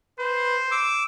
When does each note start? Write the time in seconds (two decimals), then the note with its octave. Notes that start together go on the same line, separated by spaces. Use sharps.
0.18 B4 C5
0.71 D6 E6